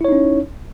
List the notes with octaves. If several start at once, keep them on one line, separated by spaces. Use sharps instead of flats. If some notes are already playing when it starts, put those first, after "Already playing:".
C#4 D#4 E4 C#5